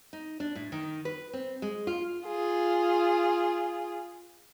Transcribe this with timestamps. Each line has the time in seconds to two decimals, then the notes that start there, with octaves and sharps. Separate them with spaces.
0.13 D#4
0.40 D4
0.55 A2
0.72 D#3
1.05 B4
1.33 C4
1.62 G#3
1.87 F4
2.24 F4 G#4